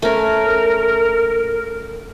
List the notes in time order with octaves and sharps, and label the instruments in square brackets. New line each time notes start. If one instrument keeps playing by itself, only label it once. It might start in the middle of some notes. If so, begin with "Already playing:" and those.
[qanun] A3 C#4 [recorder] A#4